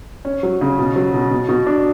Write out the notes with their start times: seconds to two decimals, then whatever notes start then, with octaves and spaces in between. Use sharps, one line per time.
0.25 C#4
0.43 F#3
0.61 C#3
0.79 B2
0.96 F#3
1.14 B2
1.31 B2
1.48 B2
1.66 D4